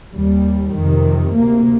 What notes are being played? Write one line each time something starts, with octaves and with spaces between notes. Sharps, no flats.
D#2 G3
F2 C3 D#3
D2 C3 A#3